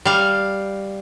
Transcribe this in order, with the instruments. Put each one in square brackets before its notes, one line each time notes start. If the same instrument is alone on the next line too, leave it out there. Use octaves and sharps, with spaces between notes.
[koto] G3 F5